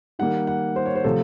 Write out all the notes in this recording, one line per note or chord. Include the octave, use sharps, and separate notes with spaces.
D#3 G3 A#3 F#5
F#5
C5
C#5
C5
C3 F3 A3 A4